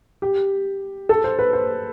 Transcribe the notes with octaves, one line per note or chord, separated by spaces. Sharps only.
G4
A4
C5
B4
C5